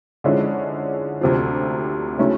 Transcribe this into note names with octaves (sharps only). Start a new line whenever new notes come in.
D3 F3 G#3 C#4 E4
D2 C3 F3
C#3 F#3 A3 C#4 E4